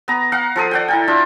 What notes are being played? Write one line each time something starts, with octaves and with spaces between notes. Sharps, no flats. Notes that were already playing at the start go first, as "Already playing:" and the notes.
B3 A#5
F5 F#5 A#5
F3 A4 D#6
D5 F#5 G5
E4 A#4 G5
D4 F4 E5